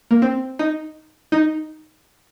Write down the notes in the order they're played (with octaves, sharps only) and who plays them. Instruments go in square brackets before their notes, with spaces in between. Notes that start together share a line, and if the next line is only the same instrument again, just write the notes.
[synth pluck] A#3
C4
D#4
D#4